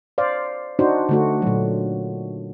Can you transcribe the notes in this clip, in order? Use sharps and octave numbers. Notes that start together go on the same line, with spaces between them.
C5 D5 F5
D4 D#4 F#4 C5
D3 A3 F#4
A#2 F#3